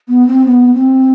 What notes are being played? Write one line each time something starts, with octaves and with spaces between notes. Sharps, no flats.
B3
C4
B3
C4